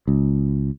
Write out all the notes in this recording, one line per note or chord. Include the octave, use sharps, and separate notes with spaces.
C#2